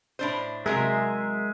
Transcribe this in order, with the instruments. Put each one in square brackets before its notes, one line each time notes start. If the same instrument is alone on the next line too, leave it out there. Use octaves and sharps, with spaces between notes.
[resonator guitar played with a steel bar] A2 D4 C5
[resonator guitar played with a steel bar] C3 F#3 A#4 [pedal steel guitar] G#3 G#4 E5